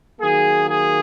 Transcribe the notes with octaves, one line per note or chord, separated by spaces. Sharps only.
D#3 F#3 A#3 G#4
G#4